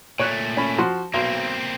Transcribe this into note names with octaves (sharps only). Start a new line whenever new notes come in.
A#2 A3 C#5 F#6
C#4 B5
F3 F#4 C6
B1 A#3 C4